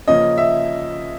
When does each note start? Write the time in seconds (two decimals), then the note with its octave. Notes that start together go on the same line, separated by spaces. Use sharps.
0.08 C#3 F3 A#3 C#4 D#5
0.38 E5